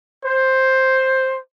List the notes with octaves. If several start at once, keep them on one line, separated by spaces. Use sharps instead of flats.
C5